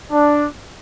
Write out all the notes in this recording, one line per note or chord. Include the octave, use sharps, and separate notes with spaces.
D4